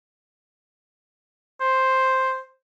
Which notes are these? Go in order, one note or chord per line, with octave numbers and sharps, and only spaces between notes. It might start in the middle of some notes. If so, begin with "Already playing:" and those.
C5